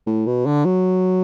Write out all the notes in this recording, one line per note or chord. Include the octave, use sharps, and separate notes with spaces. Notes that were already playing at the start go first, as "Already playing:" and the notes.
A2
B2
D3
F#3